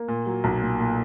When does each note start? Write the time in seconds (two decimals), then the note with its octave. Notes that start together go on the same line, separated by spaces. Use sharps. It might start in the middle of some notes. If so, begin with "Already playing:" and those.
Already playing: A#3
0.08 A#2
0.26 F#3
0.44 B1
0.62 A#2
0.80 A#2